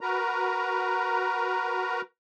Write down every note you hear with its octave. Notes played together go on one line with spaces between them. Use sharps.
F#4 A#4 B4 A#5